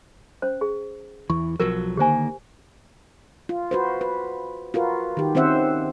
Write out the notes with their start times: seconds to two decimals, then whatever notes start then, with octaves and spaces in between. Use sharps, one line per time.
0.42 C#4 C5
0.61 G#4
1.30 E2 E3 C#6
1.60 B1 F3 F#3 A#4
1.97 D3 D#3 A#3 G4 C5 G#5
3.49 F4
3.71 F#4 B4 C5
4.01 B4
4.74 F4 F#4 A#4 B4
5.17 D#3 G4
5.35 D#3 C4 C#4 C5 E5 F#5